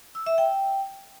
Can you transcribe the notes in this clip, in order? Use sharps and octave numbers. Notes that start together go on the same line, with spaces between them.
E6
E5
G5